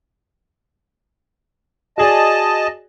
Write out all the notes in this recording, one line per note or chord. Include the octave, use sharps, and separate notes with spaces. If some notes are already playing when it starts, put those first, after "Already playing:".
F#4 G#4 D5 D#5 A5